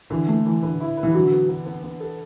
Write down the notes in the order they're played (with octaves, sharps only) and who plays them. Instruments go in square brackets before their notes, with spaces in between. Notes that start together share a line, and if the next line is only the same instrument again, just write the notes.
[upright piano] D3 [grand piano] E3
[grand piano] A3
E3
[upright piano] D3 [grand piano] B4
[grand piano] E4
B4
[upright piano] E3
[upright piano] D3 [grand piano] F#3
[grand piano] B3
B3
B3
B3
A4